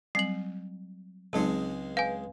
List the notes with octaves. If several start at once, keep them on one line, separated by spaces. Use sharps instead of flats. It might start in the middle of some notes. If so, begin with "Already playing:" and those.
F#3 G3 C4 C7 F#7
C#2 F#3 G#3 C4 D#4 G#4 A5
B4 F5 G#5